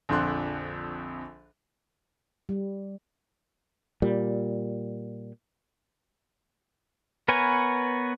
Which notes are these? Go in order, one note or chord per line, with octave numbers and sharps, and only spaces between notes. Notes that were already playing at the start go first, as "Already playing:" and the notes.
A#1 F2 D3 D4 C6 F#6
G3
A#2 G3
B3 A#4 B4 C#5 G#5